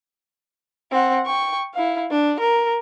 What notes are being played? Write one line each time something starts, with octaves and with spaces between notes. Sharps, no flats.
C4 F#5
G5 C#6
E4 F5
D4
A#4